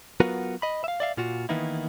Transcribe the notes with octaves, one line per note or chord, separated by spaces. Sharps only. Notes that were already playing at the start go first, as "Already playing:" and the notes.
F#3 B3 F4 F#4 A#4 B4
D#5 B5
E5 F5
D5 E5 F5
A#2 F4 F#4
D#3 E3 A#3 B3 D#4 E4